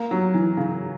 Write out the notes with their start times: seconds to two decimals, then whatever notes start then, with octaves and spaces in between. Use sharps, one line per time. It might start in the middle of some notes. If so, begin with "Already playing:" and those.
Already playing: A#3
0.11 F#3
0.34 E3
0.57 C#3